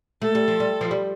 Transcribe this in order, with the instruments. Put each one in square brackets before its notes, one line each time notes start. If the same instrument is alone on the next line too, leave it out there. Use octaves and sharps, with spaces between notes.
[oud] A3 [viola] A4
[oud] G3
F3
G3
F3
G3